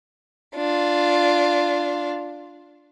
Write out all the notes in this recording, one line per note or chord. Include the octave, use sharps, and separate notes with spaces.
D4 F4